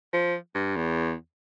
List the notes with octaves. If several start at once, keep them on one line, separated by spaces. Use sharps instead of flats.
F3
G2
E2